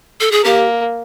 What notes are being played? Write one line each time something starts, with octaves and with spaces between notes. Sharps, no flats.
A4
G#4
A#3 G4